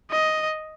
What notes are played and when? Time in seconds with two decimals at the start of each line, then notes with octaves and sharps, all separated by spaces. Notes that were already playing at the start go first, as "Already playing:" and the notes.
0.11 D#5